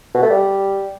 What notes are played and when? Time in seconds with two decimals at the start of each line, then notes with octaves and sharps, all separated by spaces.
0.14 B2
0.22 A3
0.30 G3